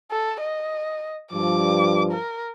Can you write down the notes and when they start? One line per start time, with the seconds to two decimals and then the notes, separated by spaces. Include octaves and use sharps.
0.11 A4
0.41 D#5
1.32 G2 F3 D6
2.12 A#4